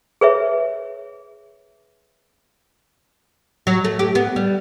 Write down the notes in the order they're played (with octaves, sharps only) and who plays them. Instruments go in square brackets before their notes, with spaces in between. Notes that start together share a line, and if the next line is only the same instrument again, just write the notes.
[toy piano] G#4 B4 C#5 E5
[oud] F#3
A3
G4
B3
G3